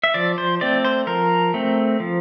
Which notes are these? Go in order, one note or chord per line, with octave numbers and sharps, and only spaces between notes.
E5
F3 D5
C5
A3 C4 D5
C5
F3 A#4
A3 C4
F3